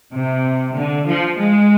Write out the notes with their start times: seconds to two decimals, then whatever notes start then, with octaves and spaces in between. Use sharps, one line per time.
0.14 C3
0.76 D3
1.07 F3
1.38 G#3